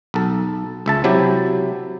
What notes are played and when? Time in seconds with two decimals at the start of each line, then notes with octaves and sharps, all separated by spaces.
0.14 B1 A4
0.86 C#2 E5 A5
1.04 C3 F#3 E4 G4